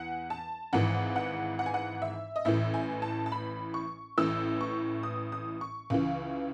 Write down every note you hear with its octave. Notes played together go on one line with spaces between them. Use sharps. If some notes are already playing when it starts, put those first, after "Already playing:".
Already playing: E2 F#5
A5
G#1 G#2 E3 F#5
F#5
F#5
G#5
F#5
E5
D#5
A1 A2 E3 E5
G#5
A5
A5
B5
C#6
A1 A2 E3 E6
C#6
D#6
D#6
C#6
C#2 C#3 E3